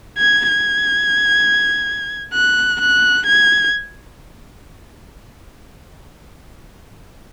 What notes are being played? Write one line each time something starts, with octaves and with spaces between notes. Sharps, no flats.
G#6
G#6
F#6
F#6
G#6